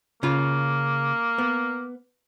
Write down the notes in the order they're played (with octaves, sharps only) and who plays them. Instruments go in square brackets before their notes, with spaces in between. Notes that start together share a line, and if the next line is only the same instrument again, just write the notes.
[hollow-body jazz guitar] C#3 F4 [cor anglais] A#3
[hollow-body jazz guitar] B3